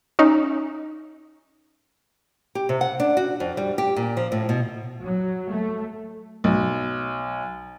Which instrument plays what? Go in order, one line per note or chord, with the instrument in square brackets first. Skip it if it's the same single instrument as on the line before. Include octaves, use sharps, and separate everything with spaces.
[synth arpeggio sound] C#4 D#4
[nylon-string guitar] G4
C3
F#5
D4
F#4
F2
G3
G4
A#2
F3
A2
B2
[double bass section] F#3
A3
[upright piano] B1